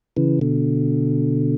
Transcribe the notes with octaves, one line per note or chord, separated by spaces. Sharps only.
C#3 E3
B2 D3